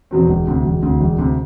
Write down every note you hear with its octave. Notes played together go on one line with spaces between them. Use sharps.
E2 B2 F#3 C4
E1
D2 C3
E1
D2 C3
E1
D2 C3